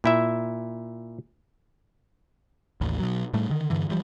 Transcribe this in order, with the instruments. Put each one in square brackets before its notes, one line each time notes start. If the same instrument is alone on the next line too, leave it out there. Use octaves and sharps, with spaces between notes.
[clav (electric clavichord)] A#2 E4 E5
[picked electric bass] A1 D#2
B2 F#3
A2 G3 A3
D3 D#3
G2 D3 E3
E3 F3 G3